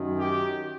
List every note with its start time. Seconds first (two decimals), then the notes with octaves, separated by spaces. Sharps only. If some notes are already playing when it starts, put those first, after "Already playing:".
Already playing: F#2 D#3
0.18 G4